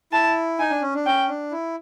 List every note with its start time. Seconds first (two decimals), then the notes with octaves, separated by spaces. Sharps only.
0.13 E4 A5
0.59 D#4 G#5
0.71 D4
0.82 C#4
0.95 D4
1.05 C#4 G5
1.29 D4
1.51 E4